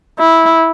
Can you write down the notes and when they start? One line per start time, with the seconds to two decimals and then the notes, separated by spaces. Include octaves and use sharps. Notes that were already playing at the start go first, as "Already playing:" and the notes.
0.19 E4